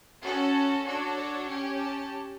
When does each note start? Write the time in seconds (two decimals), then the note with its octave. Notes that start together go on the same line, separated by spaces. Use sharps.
0.22 C#4 F#4 A4
0.85 D4 F#4 A4 C#5
1.17 C#5
1.48 C#4 G4
1.80 A5